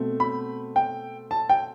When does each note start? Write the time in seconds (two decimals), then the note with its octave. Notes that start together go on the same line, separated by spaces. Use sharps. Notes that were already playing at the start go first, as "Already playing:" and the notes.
Already playing: B2 A3 C4
0.20 B5
0.76 G5
1.31 A5
1.49 G5